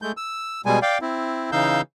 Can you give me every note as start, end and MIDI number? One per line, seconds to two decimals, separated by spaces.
0.02 0.12 56
0.02 0.12 57
0.02 0.12 91
0.17 0.61 88
0.66 0.79 47
0.66 0.79 55
0.66 0.79 56
0.66 0.79 80
0.82 0.98 74
0.82 0.98 77
0.82 0.98 79
1.01 1.50 60
1.01 1.50 64
1.52 1.81 49
1.52 1.81 52
1.52 1.81 63
1.52 1.81 77
1.52 1.81 88
1.52 1.81 91